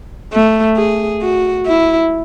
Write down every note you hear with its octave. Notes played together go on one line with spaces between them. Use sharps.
A3
G#4
F#4
E4